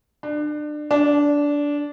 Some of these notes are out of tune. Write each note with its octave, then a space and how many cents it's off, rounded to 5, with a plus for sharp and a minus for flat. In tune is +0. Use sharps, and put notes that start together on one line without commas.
D4 +30
D4 -15